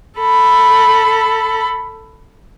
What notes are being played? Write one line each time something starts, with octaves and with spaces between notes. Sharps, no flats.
A4 B5